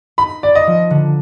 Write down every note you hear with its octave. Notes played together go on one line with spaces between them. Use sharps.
D#4 B5
B3 D5
D#5
F3
D3